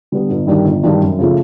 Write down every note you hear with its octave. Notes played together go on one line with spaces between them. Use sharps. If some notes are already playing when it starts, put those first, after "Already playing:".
D3 G3 B3
G1
G2 D#3 G3
G1
G2 D#3 G3
F#2
C#3 F3 A3